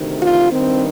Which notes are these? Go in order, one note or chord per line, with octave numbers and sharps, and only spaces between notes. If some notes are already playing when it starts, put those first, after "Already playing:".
Already playing: D2 C3 D#3
F4
G2 D#3 C4